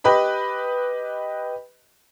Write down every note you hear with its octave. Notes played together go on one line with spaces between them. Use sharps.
G4 B4 D#5 B5